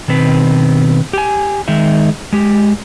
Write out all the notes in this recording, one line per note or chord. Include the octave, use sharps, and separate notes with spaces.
B2 D#3 C4 B4
G4 G#5
D#3 G#3 D#4 E5
G#3 G4